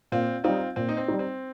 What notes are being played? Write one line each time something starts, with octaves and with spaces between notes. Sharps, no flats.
A#2 C4 F4
G3 C4 D#4 F4
A#2 C4
D#4
C4
G3 D#4
C4